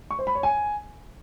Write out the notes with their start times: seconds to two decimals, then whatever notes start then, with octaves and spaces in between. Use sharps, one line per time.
0.11 C#6
0.19 C5
0.27 B5
0.35 C#5
0.43 G#5